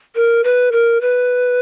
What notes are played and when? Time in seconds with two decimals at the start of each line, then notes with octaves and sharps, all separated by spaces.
0.16 A#4
0.44 B4
0.72 A#4
1.01 B4